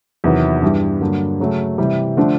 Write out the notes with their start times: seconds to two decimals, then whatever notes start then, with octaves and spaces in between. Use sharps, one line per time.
0.24 E2 C3 D#3 F#3 B3
0.62 G2 E3 G3
1.01 G2 D3 F#3 A#3 D4
1.40 C#3 F#3 A3
1.78 C3 E3 G3
2.17 D3 F3 A3 D4